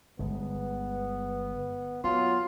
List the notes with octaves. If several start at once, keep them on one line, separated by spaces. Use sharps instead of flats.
G1 G#3 B3
F#3 B3 F4